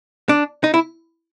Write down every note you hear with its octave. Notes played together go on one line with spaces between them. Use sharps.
D4
D#4
E4